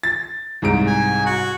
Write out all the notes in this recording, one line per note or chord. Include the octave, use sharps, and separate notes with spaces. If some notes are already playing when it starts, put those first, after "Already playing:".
A6
C2 G#2 D7
G#5
F#4